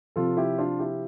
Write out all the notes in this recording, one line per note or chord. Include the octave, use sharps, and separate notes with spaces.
C3 F3 F4 A4
E4 G4
D4 F4
E4 G4